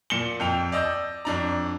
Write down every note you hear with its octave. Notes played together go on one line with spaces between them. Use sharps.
A#2 C#7 E7 G7
F2 G5 F7
D5 D#5 E6 G6
F2 D4 A#5